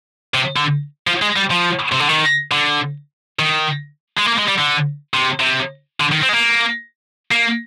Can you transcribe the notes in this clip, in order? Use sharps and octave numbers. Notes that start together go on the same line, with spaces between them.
C3
D3
F3
G#3
G3
F3
C3
D3
D#3
D3
D#3
G#3
A#3
G#3
G3
D3
C3
C3
D3
D#3
C4
G#3
A#3
A#3